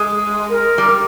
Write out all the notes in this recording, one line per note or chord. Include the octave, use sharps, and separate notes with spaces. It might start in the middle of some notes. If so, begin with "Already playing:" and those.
Already playing: G#3
A#4
G3